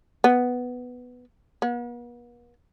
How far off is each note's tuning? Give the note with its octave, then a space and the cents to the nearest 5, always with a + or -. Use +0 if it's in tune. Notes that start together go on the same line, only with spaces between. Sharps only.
B3 +5
B3 -45